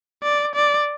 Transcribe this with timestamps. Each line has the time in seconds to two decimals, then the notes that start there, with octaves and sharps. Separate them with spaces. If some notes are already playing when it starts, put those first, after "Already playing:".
0.23 D5
0.55 D5